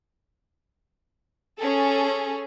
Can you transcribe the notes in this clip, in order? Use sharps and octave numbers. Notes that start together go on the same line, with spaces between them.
C#4 G#4 A4